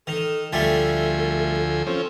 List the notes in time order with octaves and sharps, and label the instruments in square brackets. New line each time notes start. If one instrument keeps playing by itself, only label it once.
[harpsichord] D#3 [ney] A4
[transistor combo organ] D2 F3 G#5 [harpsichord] G3 A3 [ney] A4
[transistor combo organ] F3 C4 C#4 [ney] A4